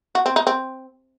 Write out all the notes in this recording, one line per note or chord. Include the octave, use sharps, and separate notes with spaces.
F#4
C4
D#4
C4